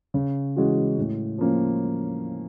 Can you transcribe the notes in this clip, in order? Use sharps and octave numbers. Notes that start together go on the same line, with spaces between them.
C#3
E3 G#3 C#4 F#4
A2
F3 A#3 C#4